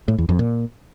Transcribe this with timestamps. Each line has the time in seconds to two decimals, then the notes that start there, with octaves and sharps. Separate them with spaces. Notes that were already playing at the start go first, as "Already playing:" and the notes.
0.08 A2
0.18 E2
0.29 F2
0.39 A#2